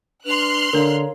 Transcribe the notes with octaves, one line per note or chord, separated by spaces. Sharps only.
D4 B4 C6 F6 F#6
D3 D4 A#4 C#5 F5 A#5